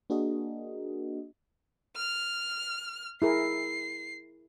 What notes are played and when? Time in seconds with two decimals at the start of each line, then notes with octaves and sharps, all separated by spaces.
0.10 A#3 D4 F#4 G#4 A#4 D#5
1.96 F6
3.22 E4 G#4 A#4 C7